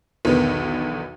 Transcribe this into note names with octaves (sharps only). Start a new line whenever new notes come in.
B1 E2 D3 D#3 B3